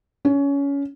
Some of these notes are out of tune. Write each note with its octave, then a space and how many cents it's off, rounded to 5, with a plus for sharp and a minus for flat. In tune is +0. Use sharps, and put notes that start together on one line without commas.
C#4 +20